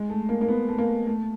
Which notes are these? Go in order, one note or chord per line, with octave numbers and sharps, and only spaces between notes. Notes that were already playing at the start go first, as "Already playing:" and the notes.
Already playing: G#3
A3
A#3
A#3
B3
A3
A#3
A3